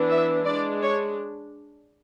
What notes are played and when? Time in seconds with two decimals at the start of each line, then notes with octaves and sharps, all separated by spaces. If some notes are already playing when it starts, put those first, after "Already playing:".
Already playing: E3 B3 D4
0.10 E5
0.45 G#3 D4 D5
0.82 C#5